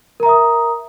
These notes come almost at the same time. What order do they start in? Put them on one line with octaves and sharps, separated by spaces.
A#4 A#5 E5 D#6